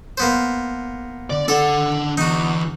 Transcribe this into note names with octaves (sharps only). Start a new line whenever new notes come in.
A#3 B3 C5
D3 D5
D4 A4 D5 F#5
E2 D#4 F#4